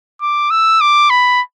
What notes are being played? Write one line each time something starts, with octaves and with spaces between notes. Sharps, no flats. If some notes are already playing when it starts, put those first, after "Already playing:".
D6
E6
D6
B5